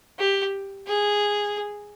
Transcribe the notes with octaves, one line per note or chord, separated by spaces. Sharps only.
G4
G#4